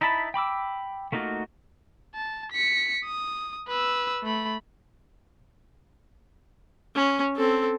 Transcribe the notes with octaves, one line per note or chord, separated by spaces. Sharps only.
D#4 E4 E5 A5 B5
G5 B5 D6 E6
A3 A#3 D#4 F4 F#4
A5
B6 C#7
D#6
B4 E6
A3 B5
C#4
C4 A4